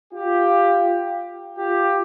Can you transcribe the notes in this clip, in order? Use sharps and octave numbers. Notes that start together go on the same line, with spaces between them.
F4 G4
F4 G4